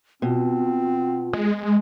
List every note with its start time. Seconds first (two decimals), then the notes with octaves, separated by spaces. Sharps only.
0.22 B2 C4 F4
1.33 G#3